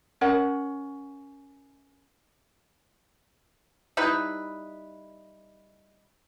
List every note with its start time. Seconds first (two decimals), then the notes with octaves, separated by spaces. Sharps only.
0.21 C#4 A#4 C#5 F#5
3.97 G3 D#4 E4 B4